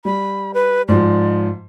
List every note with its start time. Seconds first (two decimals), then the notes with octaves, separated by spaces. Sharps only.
0.05 G3 B5
0.54 B4
0.88 G#2 F3 D5